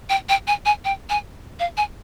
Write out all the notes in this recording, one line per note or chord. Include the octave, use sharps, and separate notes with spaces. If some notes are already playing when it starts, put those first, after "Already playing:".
G5
G5
G#5
G#5
G5
G#5
F5
G#5